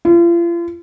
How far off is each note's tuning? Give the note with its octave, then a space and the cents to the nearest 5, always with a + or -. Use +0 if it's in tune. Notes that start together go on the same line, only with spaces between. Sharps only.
F4 -40